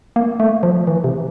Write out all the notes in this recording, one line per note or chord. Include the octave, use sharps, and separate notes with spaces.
A#3
A3
F3
E3
C3